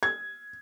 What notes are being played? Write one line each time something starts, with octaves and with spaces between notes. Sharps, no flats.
G#6